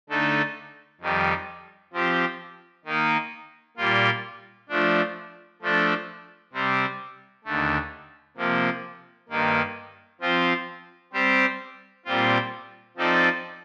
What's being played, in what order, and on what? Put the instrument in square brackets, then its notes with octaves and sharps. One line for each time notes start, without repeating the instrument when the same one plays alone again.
[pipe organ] D3 A3 D#4 A4
F2 D#3 G3
F3 C4 G4
D#3 A#3 D#4
A#2 G3 A#3 F4
F3 A3 D4
F3 A3 D4 A4
C3 G3 C4
D#2 D3 A3
C3 F3 A#3
G2 D#3 A#3
F3 C4 F4
G3 C4 G4 C5
A#2 G3 C4 F4
F3 C4 D#4 A4 D5